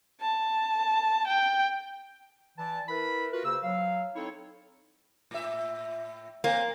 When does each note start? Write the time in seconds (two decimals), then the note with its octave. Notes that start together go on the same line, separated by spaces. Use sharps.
0.21 A5
1.27 G5
2.58 E3 D5 A5
2.89 E4 A#4 B4 B5
3.32 F4 F#4 A#4 B4
3.45 C#3 A#3 F#4 C5 E6
3.63 F#3 F5
4.16 C4 D#4 E4 A4 C#5
5.31 A2 E5
6.44 A#3 C4 C5